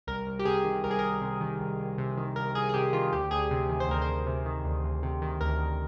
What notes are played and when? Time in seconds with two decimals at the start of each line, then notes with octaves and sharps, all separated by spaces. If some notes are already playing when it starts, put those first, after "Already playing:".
0.07 C2 A#4
0.27 C2
0.39 G4
0.45 C3 G#4
0.64 D#3
0.84 C2 A#4
0.91 G#4
0.99 C2 A#4
1.22 C3
1.41 D#3
1.60 C2
1.79 C2
1.98 C3
2.17 D#3
2.36 C2 A#4
2.55 C2 G#4
2.69 G#4
2.74 C3 G4
2.93 D#3 F4
3.12 D2 G4
3.31 D2 G#4
3.51 C3
3.69 D#3
3.80 C5
3.88 D2 A#4
4.02 C5
4.08 D2
4.26 C3
4.46 D#3
4.65 D2
4.84 D2
5.03 C3
5.22 D#3
5.41 D2 A#4
5.60 D2